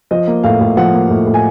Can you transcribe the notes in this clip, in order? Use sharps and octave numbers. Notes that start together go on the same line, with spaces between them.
F3 D#5
A#3
A2 F5
A2
F3 F#5
A#3
A2
A2
G#5